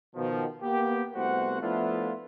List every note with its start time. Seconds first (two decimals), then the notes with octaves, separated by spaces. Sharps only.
0.16 B2 D#3 F3
0.63 A#3 B3 G4
1.15 C2 A3 B3 F#4 C5 F#5
1.62 F3 A3 B3 D4 E4 F4